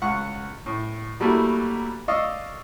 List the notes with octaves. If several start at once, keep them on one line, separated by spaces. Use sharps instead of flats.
C#2 F#5 C#6
A2
F#3 G3 A3 A#3 E4
D5 D#5 F5 C#6 D#6 E6